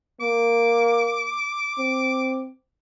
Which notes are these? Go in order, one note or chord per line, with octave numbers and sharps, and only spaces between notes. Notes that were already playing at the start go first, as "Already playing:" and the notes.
A#3 D6
C4